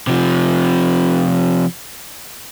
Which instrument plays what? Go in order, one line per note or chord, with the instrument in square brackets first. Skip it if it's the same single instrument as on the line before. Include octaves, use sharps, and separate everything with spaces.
[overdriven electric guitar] C3 F3